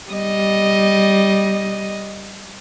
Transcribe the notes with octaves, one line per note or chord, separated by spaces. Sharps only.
G3 D#5